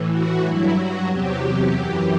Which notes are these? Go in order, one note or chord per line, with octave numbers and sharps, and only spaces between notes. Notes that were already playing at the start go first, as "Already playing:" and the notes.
Already playing: A2 E3
F#4
G2 F#3 E4
F#4
E2 C3 F#3 G4
F#2 E3